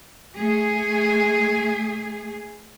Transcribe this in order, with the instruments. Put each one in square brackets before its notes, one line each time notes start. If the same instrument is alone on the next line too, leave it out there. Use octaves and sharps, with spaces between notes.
[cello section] A3 G#4